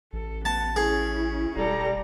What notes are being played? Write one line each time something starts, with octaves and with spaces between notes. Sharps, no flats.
A1 A4
B3 A5
C#4 E4 G#4
E1 G3 A4 A#5